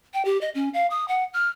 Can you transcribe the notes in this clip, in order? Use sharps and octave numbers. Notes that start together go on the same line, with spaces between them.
G5
G4
D#5
C#4
F5
D#6
F#5
F6